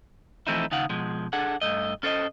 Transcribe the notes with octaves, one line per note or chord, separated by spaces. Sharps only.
E3 F3 A3 C4 D#4 E4
D#2 C#3 D#4 F5 F#5
B2 F3 G#3
D4 G#4 A4 F#5
G2 A#2 A3 D#5
C#4 A4 C5 D5 D#5